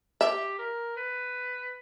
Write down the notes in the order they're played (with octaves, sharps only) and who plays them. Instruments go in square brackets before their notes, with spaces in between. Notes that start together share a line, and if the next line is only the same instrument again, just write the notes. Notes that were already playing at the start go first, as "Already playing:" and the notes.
[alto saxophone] G4 [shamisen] E5
[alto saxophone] A#4
B4